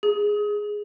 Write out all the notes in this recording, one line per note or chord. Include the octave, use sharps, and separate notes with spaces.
G#4